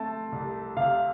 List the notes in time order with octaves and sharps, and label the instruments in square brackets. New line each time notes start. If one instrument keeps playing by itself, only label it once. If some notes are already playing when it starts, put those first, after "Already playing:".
Already playing: [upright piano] A3 C4 [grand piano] A5
[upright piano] C2
[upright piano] C3 [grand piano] F5